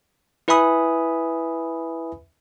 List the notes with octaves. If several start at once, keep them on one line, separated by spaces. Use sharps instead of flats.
E4 B4 E5 G#5 B5 D#6